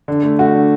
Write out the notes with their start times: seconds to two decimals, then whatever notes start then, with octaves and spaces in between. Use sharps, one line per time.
0.08 D3
0.23 A3
0.39 A3 F#4
0.54 D3